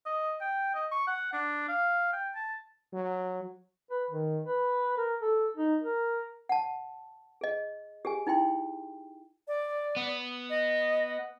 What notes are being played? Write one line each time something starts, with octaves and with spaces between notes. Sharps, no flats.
D#5
G5
D#5
C#6
F#5
D4
F5
G5
A5
F#3
B4
D#3
B4
A#4
A4
D#4
A#4
F#5 A5
G#4 D#5
G4 G#4 G#5
D#4 E4 G5 C6
D5
B3
D#5